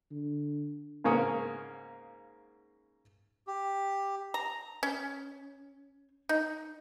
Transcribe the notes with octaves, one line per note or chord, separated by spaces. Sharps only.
D3
G#2 C#3 A#3 C#4 D#6
G4
A#5
C#4
D#4